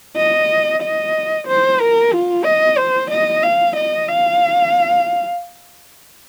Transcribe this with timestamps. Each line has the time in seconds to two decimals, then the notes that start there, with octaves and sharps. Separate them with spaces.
0.17 D#5
0.82 D#5
1.47 C5
1.80 A#4
2.13 F4
2.45 D#5
2.77 C5
3.10 D#5
3.43 F5
3.76 D#5
4.08 F5